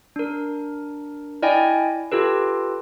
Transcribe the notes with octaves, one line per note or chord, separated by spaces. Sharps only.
D4 A#4
E4 D5 D#5 G5 G#5
F4 G4 A4 B4